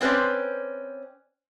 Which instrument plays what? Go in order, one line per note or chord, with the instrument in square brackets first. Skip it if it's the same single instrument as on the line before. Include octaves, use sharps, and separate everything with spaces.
[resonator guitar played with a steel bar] C4 C#4 B4 C5 D5